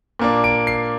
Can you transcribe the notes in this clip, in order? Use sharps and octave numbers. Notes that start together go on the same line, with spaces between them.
A#2 A#3 D4
D7
C7